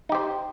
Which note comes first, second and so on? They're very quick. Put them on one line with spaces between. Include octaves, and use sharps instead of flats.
D#4 G4 C5